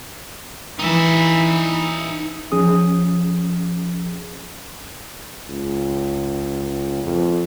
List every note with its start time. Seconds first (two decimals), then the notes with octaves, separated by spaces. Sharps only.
0.79 E3 D#4 E5
2.52 F3 C#4 G#4 D#6
5.48 C#2
7.04 F2